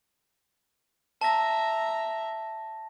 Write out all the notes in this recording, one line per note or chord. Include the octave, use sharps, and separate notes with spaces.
E5 A5 A#5 A#6